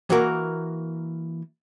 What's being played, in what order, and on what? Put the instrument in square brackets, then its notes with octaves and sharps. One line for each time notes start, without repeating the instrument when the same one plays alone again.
[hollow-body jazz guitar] E3 A#3 F#4 A#4